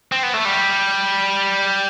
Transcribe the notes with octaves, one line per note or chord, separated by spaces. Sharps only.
C4
B3
A3
G3